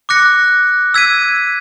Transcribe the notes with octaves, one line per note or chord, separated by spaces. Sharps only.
D6 F#6 A#6 C#7
E6 G#6 B6 D#7